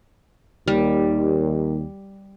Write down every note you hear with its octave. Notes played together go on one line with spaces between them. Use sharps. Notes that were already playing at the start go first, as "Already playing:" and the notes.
D#2 G3